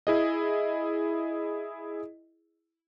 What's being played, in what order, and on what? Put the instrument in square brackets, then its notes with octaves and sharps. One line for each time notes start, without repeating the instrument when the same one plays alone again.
[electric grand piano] E4 G#4 D#5